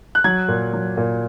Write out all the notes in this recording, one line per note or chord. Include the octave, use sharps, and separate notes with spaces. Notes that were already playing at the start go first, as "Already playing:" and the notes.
F#6
F#3 G#6
A#2
F#3
A#2